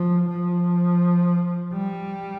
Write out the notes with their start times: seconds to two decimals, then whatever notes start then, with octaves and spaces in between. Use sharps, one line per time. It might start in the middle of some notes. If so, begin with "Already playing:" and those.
Already playing: F3
0.29 F3
1.73 G3